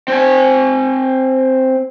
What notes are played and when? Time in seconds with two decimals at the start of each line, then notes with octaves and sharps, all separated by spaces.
0.08 C4 G#5